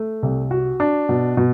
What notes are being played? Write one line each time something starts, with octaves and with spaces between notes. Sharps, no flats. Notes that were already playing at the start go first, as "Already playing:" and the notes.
Already playing: A3
C2
F#4
D4
B2
B2